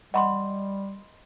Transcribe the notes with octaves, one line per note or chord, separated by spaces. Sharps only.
G3 D#5 F#5 B5 C6